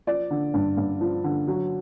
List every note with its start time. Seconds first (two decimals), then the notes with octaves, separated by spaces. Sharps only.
0.07 F3 D5
0.30 D3
0.54 G2
0.77 G2
1.01 F3
1.24 D3
1.47 F#3